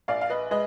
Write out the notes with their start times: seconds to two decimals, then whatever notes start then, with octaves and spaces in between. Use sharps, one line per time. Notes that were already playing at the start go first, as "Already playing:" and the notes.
0.08 A#1 D5 F5
0.21 F5
0.30 B4 D#5
0.51 G#3 B4 D#5